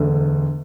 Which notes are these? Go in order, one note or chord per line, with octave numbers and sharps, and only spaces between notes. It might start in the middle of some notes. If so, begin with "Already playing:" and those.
Already playing: E1 D2 D3 A3